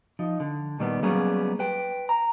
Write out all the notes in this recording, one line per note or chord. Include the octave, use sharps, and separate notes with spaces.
F3 D#4
D3
A#2 D#3 G3 A#3 B3
F#3 G3 A#3 B3 C#4 G#4
B4 G5
A#5